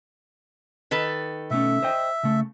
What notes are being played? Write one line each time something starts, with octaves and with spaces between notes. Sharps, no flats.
D#3 A4 B4
B2 A3 C#4 E5
C5 D#5 G5
C#3 A3